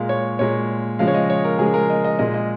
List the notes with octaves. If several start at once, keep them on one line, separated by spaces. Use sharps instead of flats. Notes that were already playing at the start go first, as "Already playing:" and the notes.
Already playing: A#2 G#3 F5
C#5
A#2 G#3 C#5
C#3 F3 G#3 F5
C#5
D#5
C#5
A#4
C#3 F3 G#3 G#4
A#4
D#5
D#5
A#2 G#3 D#5
D#5